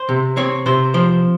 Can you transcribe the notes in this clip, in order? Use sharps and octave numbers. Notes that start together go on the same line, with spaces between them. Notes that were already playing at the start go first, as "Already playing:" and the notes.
Already playing: C5
C3
C4 C#5
C3 C5
F3 C5